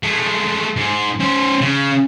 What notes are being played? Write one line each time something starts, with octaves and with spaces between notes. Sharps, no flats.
G#3 A3
G#2
C#4 C5
C#3